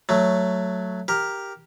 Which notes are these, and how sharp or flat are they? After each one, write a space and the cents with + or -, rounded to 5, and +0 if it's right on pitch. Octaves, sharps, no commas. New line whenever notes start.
F#3 +0 A3 +10
G4 +0 A#4 +0